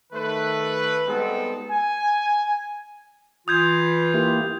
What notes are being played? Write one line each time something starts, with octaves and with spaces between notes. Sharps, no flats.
D#3 A3 B4
G3 G#3 B3 C4 D#4 A4
G#5
E3 F4 D#6 G6 G#6
A#3 E4 G4